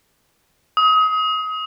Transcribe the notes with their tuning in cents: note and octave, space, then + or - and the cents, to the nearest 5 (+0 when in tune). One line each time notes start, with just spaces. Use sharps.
D#6 +30